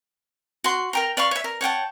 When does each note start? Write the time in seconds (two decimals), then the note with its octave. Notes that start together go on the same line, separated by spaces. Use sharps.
0.64 F#4 C6
0.93 A#4 G5 A#5
1.17 D5 F5 B5 C#6
1.31 C#5 E5
1.44 A#4
1.61 C#5 F#5 G5 A5